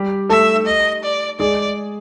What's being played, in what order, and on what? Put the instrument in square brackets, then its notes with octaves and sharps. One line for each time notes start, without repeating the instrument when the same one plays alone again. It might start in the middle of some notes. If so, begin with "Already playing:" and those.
Already playing: [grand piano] G3 G4
[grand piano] A3 A4 [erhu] E5
[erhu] D#5
D5
[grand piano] G#3 G#4 [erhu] D5